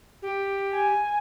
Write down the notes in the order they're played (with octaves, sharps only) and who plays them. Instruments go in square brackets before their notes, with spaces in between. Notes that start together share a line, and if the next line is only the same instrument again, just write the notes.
[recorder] G4
[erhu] G#5